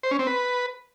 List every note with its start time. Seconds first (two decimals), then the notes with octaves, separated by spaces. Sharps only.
0.03 C5
0.11 C#4
0.19 C4
0.27 B4